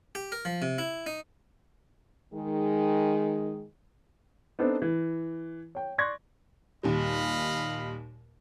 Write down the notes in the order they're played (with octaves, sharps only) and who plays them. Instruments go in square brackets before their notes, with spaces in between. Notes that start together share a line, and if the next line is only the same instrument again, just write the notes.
[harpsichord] G4
A#4
F3
C3
E4
D#4
[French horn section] D#3 G#3
[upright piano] B3 C4 D4 D#4 A4 C5
E3
C#5 G5
D5 C6 C#6 F#6 G#6 A#6
[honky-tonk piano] D#2 A#2 G3 [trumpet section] D#5 F5 B5